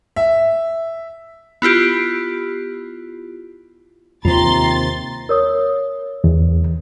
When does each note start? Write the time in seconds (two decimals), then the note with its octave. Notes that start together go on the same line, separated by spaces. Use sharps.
0.16 E5
1.62 B3 E4 F4 G4
4.25 D#2 C3 C4 F4 C5 A#5 C6 A6
5.29 A#4 C#5 D#6
6.24 E2